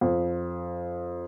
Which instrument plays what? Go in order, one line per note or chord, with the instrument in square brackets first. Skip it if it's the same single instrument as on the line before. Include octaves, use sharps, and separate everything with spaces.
[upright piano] F2